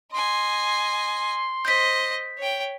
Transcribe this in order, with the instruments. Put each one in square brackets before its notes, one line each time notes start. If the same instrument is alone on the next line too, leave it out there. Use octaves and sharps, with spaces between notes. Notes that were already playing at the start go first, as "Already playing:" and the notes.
[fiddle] D#5 G#5 [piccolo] C6
[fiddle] C5 D#5 [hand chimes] G6 B6
[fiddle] C#5 G5